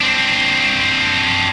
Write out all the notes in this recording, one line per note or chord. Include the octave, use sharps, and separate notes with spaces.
C4 D4